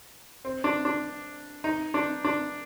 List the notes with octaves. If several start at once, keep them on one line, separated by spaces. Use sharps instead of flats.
C4
D4
D4
D#4
D4
D4